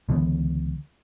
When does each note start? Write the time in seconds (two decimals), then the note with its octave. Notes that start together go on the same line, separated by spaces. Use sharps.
0.09 C#2 D3 E3 B3